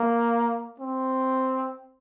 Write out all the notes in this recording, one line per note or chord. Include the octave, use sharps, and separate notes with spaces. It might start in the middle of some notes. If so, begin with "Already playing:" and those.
Already playing: A#3
C4